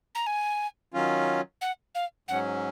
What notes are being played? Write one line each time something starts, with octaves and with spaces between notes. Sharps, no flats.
A#5
G#5
D#3 F#3 C#4 F4
F#5
F5
G#2 F#3 C#4 F#5